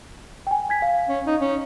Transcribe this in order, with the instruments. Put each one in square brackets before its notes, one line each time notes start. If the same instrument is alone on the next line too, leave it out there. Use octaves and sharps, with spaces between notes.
[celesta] G5 G#5
G#5 G#6 B6
F5
[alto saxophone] C#4
D#4
C#4